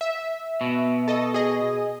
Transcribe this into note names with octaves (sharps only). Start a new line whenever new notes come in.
E5
B2
A4 D#5
G#4 D#5